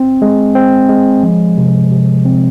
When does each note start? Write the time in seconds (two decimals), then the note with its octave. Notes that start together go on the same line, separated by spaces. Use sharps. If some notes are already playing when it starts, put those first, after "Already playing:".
Already playing: C4
0.22 G#3
0.55 C4
0.89 G#3
1.23 F3
1.58 C3
1.91 C3
2.25 C4